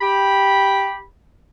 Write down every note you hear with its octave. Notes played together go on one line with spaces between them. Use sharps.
G4 G5 B5